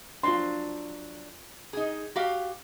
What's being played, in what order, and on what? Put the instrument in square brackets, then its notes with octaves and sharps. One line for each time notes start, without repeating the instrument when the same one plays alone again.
[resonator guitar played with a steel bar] F#3 D4 [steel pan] F4 C6
[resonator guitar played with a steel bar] D#4 G#4
F#4 G4 F5